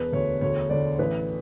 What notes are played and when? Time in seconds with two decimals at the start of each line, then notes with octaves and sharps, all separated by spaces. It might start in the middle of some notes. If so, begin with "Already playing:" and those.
Already playing: E1 B4
0.12 D2 C#5
0.41 D2 C#5
0.70 D3 D5
0.99 A1 B4